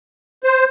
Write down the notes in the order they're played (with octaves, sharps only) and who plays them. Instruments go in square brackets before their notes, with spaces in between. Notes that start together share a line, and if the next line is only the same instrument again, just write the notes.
[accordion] C5